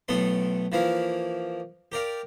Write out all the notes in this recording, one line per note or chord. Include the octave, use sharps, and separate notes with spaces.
B1 A2 B3 A4 C6
E3 F3 A#3 E4 F5
G4 A#4 D5 F5